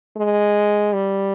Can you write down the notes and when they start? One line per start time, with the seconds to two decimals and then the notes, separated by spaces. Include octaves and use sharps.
0.17 G#3
0.93 G3